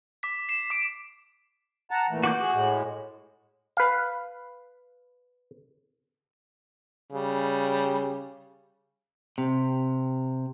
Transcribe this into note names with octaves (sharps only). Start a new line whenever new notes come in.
D6 B6
C7 E7
D6 D7
F#5 A5 A#5
A#2 E3 A3
F#4 D6 G6
G#4
A2 G#3
B4 F5
C#3 G3
C3